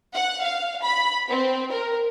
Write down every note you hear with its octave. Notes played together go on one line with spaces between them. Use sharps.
F#5
F5
B5
C4
A#4